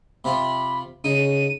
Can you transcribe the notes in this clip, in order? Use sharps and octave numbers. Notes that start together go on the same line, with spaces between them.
C3 F4 B5
C#3 D#4 D#7